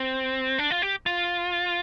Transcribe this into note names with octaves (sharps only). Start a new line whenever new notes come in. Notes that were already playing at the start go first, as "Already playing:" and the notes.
Already playing: C4
D4
F4
G4
F4